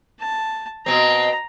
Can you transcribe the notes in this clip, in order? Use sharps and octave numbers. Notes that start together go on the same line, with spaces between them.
A5
B2 C4 A#5